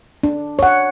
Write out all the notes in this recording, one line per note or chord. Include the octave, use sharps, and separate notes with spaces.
D4
C#5 F#5